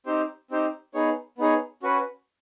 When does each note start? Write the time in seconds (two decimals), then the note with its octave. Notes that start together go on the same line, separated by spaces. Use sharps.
0.06 C4 D#4 G4 C5
0.51 C4 D#4 G4 C5
0.94 B3 D#4 G#4 C#5
1.38 B3 D#4 G#4 C#5
1.83 C#4 F#4 B4